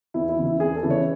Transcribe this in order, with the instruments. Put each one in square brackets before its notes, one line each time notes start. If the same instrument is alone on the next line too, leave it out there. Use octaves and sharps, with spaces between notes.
[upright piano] E2 E4
E4
C#3 E3
E4
E2 G#4
A4
C#3 E3
C#5